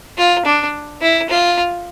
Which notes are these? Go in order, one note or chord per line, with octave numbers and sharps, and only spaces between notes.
F4
D4
E4
F4